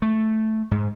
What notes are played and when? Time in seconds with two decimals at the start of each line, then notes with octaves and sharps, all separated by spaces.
0.02 A3
0.71 G#2